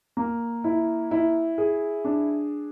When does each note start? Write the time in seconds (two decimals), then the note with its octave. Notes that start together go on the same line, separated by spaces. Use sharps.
0.17 A#3
0.64 E4
1.11 E4
1.58 G#4
2.05 D4